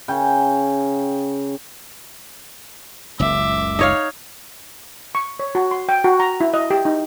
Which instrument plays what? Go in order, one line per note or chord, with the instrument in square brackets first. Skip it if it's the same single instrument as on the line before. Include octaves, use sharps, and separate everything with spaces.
[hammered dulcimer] C#3 G5
[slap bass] F#1 C#2 [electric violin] E5 D6
[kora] D#4 C#5 F5
[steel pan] C#6
C#5
F#4
C6
G5
F#4
A#5
E4
D#5
G4
D#4